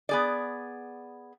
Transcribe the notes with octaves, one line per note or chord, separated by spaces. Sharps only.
B3 G#4 D5